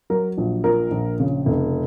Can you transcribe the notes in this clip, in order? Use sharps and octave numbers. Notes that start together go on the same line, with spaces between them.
F#3 A#4
A#1
A#2 A#4
A#1
C#3
F1